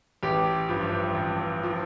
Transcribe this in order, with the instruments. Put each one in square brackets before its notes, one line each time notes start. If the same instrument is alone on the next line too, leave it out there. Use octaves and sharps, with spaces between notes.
[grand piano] A1 G4
G2 F3
A1
F3